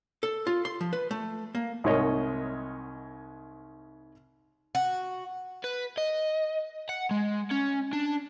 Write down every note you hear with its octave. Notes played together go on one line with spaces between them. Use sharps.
A4
F4
C6
F3
B4
A3
A#3
C2 G#2 A#4 C#5 D#5
F#4
B4
D#5
F#5
G#3
C#4
D4